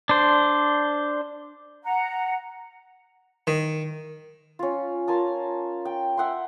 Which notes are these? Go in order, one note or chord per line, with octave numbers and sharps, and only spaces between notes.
D4 C5
F#5 A#5
D#3
C#4 F4
F4 A#4 G#5 A5
G5
E5 F#5 G5 C6